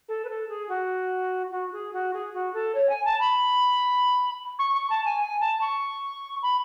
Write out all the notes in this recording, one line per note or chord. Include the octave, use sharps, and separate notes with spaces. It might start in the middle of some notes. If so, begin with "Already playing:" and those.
A4
B4
A4
G#4
F#4
F#4
G#4
F#4
G#4
F#4
A4
C#5
G#5
A5
B5
C#6
C#6
A5
G#5
G#5
A5
C#6
B5